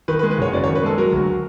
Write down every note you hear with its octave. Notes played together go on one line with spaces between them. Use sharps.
D#3 B4
B4
G#3
B4
F#1 C#5
F#2 D5
C#5
D#3
B4
G#3 A4
F#3 A#4
D2